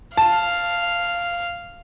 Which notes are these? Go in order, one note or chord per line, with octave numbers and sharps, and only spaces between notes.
F5 A5